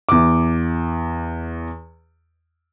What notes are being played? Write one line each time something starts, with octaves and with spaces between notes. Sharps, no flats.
E2 D6